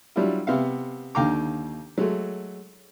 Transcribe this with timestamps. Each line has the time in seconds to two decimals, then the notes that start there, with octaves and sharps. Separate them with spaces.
0.16 F#3 G3 D4 E4 F4
0.47 C3 B3 E5 F5
1.15 D#2 D3 F5 G5 A#5 D6
1.98 F#3 G#3 A3